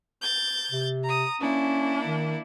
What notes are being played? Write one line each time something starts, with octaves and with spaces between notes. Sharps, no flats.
G6 A6
C3
A#5 D#6
A#3 C#4 D4 E4
D#3